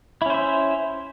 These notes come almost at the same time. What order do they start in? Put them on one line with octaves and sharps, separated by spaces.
E4 C#4 C5 E5